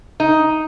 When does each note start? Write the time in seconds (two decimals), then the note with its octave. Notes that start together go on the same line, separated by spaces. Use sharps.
0.20 D#4